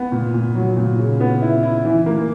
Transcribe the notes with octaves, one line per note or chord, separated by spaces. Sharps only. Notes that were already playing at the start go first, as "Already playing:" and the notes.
Already playing: B3
A#2
A#2
F#3
A#2
C#3
B3
E4
E4
E3
A#3